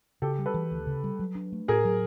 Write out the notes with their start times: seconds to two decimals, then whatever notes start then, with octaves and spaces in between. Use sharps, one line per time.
0.22 C#3 G4 A4
0.39 G3
0.46 A4 B4
0.54 E3
0.71 D2
0.87 C#3
1.04 G3
1.19 F#3
1.35 D4
1.52 A3
1.68 A2 G#4 A#4
1.85 F#3